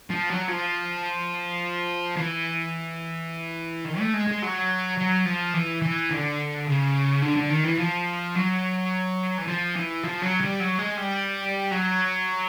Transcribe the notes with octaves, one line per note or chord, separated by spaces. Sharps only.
F3
F#3
F3
E3
D#3
A3
G#3
G#3
F#3
F#3
F3
E3
E3
D3
C#3
D3
D3
D#3
E3
F3
F#3
E3
F3
E3
F3
F#3
G3
F#3
G#3
G3
F#3